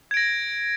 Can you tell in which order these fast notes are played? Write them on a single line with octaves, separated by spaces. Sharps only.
G#6 D7 A#6